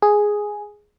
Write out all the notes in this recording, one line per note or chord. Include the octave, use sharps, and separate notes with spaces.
G#4